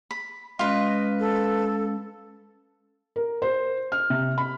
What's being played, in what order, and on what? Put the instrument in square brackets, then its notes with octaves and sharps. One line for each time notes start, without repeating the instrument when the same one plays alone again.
[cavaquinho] B5
[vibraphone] G#3 C#4 F5 [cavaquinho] F4 B4 [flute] D#5
[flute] A4
[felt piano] A#4
C5
F6
C3
B5